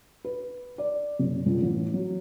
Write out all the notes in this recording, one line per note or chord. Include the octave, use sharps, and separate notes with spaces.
B4
D5
F#1
C#2
A1
F#3